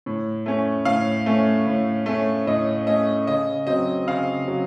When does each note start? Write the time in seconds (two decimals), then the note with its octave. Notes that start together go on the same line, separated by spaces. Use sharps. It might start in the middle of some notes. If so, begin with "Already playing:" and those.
0.06 A2
0.46 A3 C#4
0.85 A2 F5
1.26 A3 C#4
1.67 A2
2.06 A3 C#4
2.47 A2 D#5
2.86 A3 C#4 D#5
3.27 C#3 D#5
3.67 F#3 C4 D#5
4.07 C#3 F5
4.48 F#3